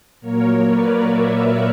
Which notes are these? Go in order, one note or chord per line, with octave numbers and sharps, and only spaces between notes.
A#2 F#3 A#3 A#4 C#5
B4 D5
C#5 E5